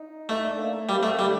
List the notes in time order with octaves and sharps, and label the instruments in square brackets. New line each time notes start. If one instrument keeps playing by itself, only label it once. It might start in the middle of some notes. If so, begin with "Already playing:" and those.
Already playing: [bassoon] D#4
[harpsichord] A3 [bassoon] D#4
[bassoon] D4
A#3
A3
[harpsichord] G3 [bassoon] A#3
[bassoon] C4
[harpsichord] A3
[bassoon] A#3
[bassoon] D3 [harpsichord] G3